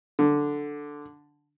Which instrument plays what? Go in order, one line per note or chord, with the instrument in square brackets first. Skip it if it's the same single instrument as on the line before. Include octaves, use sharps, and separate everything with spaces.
[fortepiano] D3